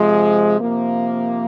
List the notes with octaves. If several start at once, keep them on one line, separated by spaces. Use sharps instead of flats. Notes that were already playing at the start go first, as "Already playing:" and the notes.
Already playing: C3 F3 G#3
C3 F3 A#3